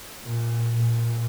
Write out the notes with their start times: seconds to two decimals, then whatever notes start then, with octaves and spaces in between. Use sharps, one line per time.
0.23 A#2
0.76 A#2